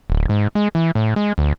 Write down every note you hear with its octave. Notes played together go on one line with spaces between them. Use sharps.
D1
G#2
G#3
E3
A2
G#3
D2